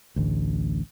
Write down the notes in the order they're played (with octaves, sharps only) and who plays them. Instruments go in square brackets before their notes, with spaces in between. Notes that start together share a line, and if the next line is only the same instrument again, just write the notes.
[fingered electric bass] A1 D2